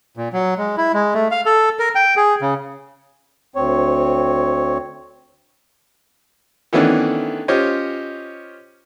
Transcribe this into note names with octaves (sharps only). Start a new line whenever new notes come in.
A#2
F#3
G#3
E4
G#3
A3
F5
A4
A#4
G5
G#4
C#3
D2 C4 C#5
D#3 E3 A3 B3 C#4 D4
C#4 F4 G4 C5 C#5 D#5